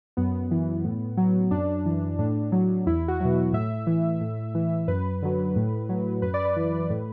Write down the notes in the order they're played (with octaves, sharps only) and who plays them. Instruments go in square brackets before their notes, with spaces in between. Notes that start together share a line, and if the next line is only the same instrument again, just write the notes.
[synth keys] F#2 B3
E3
A2
F#3
F#2 D4
E3
A2 D4
F#3
E2 E4
F#4
B2 F#3
F#4
A2 E5
E3
A2
E3
F#2 B4
D3 F#3
A2
F#3
F#2 B4
D5
B4
E3
A2